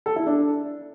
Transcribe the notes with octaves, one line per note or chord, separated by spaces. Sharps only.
A4
E4
D4